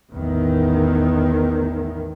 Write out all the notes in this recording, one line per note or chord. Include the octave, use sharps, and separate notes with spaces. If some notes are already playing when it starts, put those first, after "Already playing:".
A1 E2 D#3